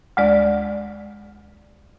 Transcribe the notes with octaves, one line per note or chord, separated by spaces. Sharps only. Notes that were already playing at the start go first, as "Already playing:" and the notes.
D2 G#3 D5